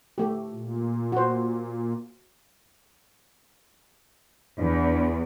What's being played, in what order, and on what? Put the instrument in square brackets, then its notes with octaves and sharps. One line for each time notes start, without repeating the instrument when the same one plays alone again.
[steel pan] A3 G4
[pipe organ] A#2
[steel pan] F#4 C5
[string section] E2 [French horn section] E3 D4